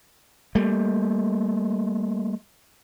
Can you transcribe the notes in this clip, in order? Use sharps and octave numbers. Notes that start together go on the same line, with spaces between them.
G3 A3 A#3